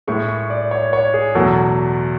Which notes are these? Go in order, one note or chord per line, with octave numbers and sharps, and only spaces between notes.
A2 G#3 C#6
C#6
D5
C#5
C#5
G#4
E2 B2 F#3 A3 A4